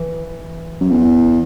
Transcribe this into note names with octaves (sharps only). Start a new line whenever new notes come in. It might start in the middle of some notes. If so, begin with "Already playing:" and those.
Already playing: E3
F#2
E2